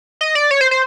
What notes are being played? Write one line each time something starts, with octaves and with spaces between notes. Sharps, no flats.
D#5
D5
C#5
C5
C5